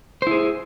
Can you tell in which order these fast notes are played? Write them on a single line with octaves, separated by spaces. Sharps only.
C5 E4 G#4